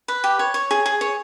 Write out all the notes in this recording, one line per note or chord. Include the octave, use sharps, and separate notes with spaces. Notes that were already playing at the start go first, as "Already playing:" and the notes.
B4
G4
C#5
C#5
G#4
G#4
C#5